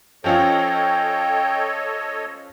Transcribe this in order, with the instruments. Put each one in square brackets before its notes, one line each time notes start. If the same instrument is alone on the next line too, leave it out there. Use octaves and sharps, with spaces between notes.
[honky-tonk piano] F3 C#4 F4 [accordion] A4 C#5 D#5 [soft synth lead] G5